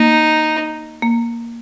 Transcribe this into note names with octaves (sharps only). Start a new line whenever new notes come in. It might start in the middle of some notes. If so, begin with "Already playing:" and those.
Already playing: A#3 D#4
A#3